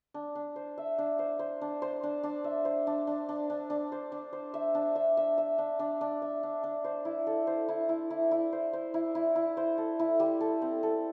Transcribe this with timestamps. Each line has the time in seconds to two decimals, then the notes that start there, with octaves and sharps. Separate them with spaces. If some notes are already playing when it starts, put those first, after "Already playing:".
0.14 D4
0.35 D4
0.56 C5
0.78 E5
0.98 D4
1.19 C5
1.39 C5
1.61 D4
1.82 C5
2.03 D4
2.23 D4
2.44 E5
2.65 C5
2.87 D4
3.07 D4
3.29 D4
3.50 D4
3.70 D4
3.92 C5
4.12 D4
4.33 C5
4.54 E5
4.75 D4
4.96 E5
5.17 E5
5.38 E5
5.58 D4
5.79 D4
6.01 D4
6.22 E5
6.43 D4
6.64 D4
6.84 C5
7.05 E4
7.27 A4
7.47 C5
7.69 E4
7.89 E4
8.10 E4
8.31 E4
8.52 C5
8.73 C5
8.94 E4
9.15 E4
9.35 E4
9.57 C5
9.78 A4
10.00 E4
10.20 G3
10.41 A4
10.62 C4
10.83 A4